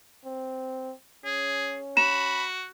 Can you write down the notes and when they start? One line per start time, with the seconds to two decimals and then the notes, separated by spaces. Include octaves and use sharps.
0.25 C4
1.25 C#4 G#4
1.97 F#4 B5 E7